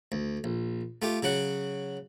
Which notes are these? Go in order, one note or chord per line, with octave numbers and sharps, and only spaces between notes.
D2
A#1
A3 F4 G4
C#3 F#3 F#4 F#5